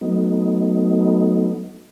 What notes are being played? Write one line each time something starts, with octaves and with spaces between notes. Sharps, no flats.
F#3 A3 B3 D#4